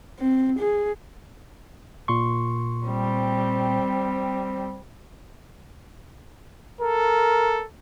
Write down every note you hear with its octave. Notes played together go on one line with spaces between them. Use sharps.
C4
G#4
A#2 C6 C#6
G3 C4
A4 A#4